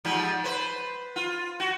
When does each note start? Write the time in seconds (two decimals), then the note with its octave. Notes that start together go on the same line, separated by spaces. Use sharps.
0.05 G#2 F3 G3
0.44 B4 C5
1.16 F4
1.60 F#4